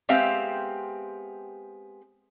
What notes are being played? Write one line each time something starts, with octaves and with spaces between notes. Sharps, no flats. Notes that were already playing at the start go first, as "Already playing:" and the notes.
G#3 B3 C4 G4 E5 F5